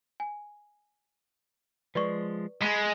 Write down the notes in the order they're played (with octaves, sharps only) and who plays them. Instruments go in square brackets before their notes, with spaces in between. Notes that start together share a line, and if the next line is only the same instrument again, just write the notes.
[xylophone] G#5
[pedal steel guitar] F3 G#3 [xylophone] B4 D5 C#6
[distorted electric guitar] G#3 [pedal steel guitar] B5